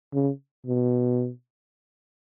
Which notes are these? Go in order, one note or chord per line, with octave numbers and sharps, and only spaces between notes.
C#3
B2